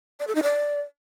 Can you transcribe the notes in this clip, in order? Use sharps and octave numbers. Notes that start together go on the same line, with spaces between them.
D5
A4
D#4
D5